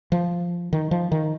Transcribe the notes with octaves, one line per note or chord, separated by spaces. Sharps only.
F3
D#3
F3
D#3